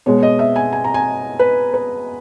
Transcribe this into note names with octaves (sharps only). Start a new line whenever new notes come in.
B2 G#3 C#5
D#5
E5
G#5
G#5
A#5
G#5
B4
B4